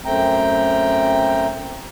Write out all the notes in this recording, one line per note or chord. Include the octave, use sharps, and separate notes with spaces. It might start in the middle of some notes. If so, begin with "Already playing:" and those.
F#2 A3 C4 G5 A#5